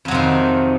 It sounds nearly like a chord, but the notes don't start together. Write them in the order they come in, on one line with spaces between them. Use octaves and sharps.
F2 F#3 C3 D#3